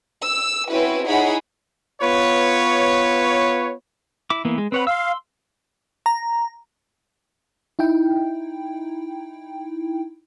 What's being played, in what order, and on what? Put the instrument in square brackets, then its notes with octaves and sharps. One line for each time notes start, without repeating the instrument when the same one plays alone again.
[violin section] E6
C4 C#4 E4 F#4 B4
D#4 E4 G#4 C#5 F#5 B5
[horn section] B3 F4 B4 C#5
[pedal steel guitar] E4 D6
E3 A#3 B3
G#3
[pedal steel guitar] C4 C#5 F#5 [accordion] B4
[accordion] F5 [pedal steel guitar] C6 E6
[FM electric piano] A#5
D#4 E4 G5